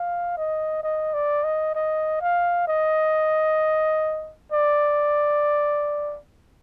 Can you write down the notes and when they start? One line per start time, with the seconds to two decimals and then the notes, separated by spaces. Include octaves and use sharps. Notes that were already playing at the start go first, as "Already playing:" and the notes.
Already playing: F5
0.37 D#5
0.83 D#5
1.14 D5
1.44 D#5
1.75 D#5
2.21 F5
2.67 D#5
4.52 D5